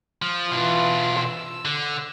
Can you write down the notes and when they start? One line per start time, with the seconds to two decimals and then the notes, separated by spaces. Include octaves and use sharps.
0.22 F3
0.51 B2 E3 D4 F4
1.21 E6
1.65 D3